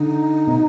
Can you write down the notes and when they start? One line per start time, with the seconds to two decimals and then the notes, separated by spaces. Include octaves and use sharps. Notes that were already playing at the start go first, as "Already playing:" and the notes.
Already playing: D3 D#4
0.47 B2